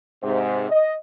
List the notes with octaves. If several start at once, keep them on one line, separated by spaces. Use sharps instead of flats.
G#2 C3
D#5